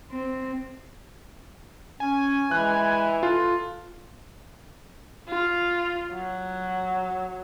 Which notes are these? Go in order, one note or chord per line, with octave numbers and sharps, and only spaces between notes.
C4
C#4 G#5
E3 G#3 F#6
F4 A4
F4
F#3